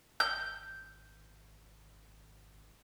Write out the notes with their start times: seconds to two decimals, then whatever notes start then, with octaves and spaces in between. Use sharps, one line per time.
0.20 G#1 G6